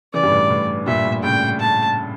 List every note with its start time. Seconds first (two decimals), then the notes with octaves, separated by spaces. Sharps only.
0.13 C#3 E3 D5
0.23 G2
0.31 A2
0.50 A2
0.86 G2 A#2 E5
1.05 A2
1.23 A2 C#3 G5
1.59 A5